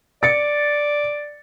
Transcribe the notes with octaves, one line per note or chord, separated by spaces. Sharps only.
D5 A6 C#7